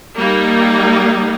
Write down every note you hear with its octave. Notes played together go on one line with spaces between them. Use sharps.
G3 A#3 D#4